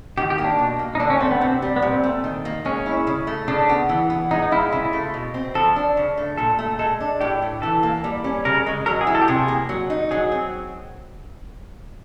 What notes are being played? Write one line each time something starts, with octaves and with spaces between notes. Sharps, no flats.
D#3 G4
G4
A#3
D4
B2
A#3
D#4
D3 D4
C#4
A3 C4
B3
C3 C4
G3
B3
A#2 C4
A3
D#3
A#3
G#3 C#4
E4
C#3
A3
C#3 D4
B3
E3
B3
G#3 D#4
D#4
E4 F4
C#3 E4
A3
B2
C4
F3 A4
D4
C#3
A3
A#2 A4
A3
G#3 A4
D4
A2 G4
A3
E3 A4
A#3
G3
C#4
C#3 A#4
G#3
F#3 A#4
G#4
E4
A4
G4
C3 G#4
A#3
F#3
D#4
F#3 G#4
C4